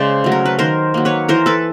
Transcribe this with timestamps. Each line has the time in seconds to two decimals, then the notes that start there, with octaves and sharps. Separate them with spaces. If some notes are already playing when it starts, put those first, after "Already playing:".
Already playing: C#3 G#3 C5 D5
0.24 F#3 A3
0.32 A#4
0.45 B4
0.59 D#3 A#4 C5
0.94 F#3 A#3
1.05 B4 C#5
1.29 E3 A#4 C5
1.46 A4 B4